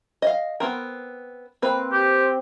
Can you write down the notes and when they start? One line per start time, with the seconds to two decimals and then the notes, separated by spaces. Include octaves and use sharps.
0.22 D#5 F5
0.60 B3 C4 A#4
1.62 A#3 C4 B4
1.92 G4